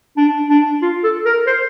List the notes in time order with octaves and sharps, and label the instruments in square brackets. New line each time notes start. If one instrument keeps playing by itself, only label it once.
[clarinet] D4
D4
F4
A4
A#4
C5